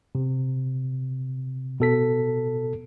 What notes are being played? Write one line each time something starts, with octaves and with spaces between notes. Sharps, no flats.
C3
B2 A4 B6